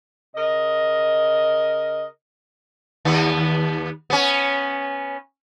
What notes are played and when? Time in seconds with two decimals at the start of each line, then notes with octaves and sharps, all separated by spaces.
0.35 C#3 A#4 D#5
3.05 D#2 B3
4.10 B3 C#4